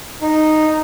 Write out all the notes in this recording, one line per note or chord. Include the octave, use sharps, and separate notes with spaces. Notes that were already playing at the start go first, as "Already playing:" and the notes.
D#4